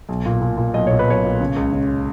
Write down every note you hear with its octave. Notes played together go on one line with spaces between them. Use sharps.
B1
A#2
A#2
A#2
B1 D#5
A#2 C#5
B4
B1 C#5
A#2
C#3
C#2
C#3